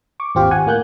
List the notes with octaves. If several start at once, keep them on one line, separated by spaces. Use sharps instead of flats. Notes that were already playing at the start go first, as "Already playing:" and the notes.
C#6 D6
G#1 D#2 C4 F4 G4 F5
F#5 G#5
A2 A#3 F#6 G6